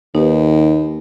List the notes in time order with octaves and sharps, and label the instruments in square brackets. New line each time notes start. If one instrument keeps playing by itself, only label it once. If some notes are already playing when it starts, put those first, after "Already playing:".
[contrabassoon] D#2 [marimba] D#4 G4 B4